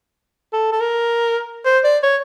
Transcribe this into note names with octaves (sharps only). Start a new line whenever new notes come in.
A4
A4
A#4
C5
D5
C#5